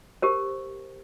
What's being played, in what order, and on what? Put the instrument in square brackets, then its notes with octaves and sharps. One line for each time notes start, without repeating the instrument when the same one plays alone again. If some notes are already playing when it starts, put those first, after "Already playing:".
[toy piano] G4 A#4 C5